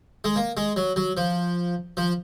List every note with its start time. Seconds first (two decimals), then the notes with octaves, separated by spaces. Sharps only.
0.24 G#3
0.36 A#3
0.57 G#3
0.76 F#3
0.96 F#3
1.17 F3
1.97 F3